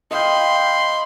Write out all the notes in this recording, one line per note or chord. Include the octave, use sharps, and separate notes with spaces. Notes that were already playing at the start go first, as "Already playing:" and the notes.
D#5 F5 G5 B5 C6